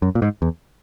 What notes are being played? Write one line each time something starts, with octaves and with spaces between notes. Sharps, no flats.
F#2
A#2
G#2
E2